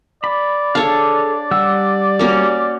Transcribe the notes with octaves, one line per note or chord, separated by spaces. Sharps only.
D5 B5
D4 G#4 A4 C#5 F5
G3 F#5 E6
A#3 C#4 F#4